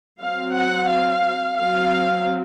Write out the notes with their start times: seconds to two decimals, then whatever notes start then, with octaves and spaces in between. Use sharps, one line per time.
0.20 F#3 C4 F5
0.55 F#5
0.90 F5
1.59 F#3 C4 F5